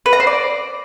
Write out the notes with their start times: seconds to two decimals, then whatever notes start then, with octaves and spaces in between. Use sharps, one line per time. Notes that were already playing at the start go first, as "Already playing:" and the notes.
0.06 B4
0.13 A#5
0.20 C5
0.27 D5